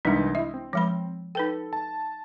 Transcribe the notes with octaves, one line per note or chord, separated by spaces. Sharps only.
C2 E3 G#3 D4 D#4
E4 D#5 E5
C4
F3 G#3 B5
D#4 A4 B4 G5
A5